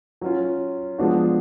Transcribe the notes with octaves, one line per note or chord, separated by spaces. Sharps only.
F#3 C#4 F4
F3 G#3 B3 D4 F#4